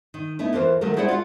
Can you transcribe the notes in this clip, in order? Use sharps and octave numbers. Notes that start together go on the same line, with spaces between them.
D#3
A3 B3 D#4 E4
F2 E3 F4 A#4 C5
D#3 F3 F#3 A3 A4 A#4
A3 E4 G#4 C5 D5 F#5
F4 F#4 E5 F#5